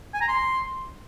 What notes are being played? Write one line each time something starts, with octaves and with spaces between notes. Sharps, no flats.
G#5
A#5
C6